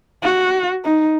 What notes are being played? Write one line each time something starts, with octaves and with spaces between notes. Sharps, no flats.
F#4
D#4